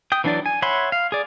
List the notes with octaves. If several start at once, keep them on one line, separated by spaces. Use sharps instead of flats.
G5 D#6
E3 F#3 D4 E4 D5
G#5
C#5 E5 F#5 B5 C6
F5
G#4 D5